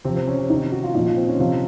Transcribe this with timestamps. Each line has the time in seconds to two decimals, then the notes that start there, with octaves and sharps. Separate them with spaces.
0.05 C3 F3 C4
0.16 C4
0.27 C#4
0.38 C#4
0.50 C3 D#3 D#4
0.72 F#4
0.84 F4
0.95 A#2 F3 D#4
1.06 F4
1.17 C4
1.28 C#4
1.39 C3 F3 F4